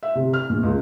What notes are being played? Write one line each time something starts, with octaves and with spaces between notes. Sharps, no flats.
E5
C3
F6
A#1
C#2